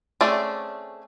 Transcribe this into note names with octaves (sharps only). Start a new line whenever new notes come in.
A3 C4 C#4 G#4 D5